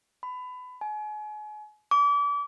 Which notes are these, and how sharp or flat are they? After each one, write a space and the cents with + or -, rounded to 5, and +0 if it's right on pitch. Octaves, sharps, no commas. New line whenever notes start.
B5 +25
G#5 +35
D6 -35